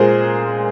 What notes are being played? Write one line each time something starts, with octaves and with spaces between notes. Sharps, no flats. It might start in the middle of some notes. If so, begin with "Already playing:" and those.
Already playing: A#2 G#3 G#4 A#4 C5